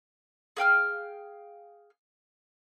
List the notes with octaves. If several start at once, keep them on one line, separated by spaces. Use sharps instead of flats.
G#4 F5 G5 F6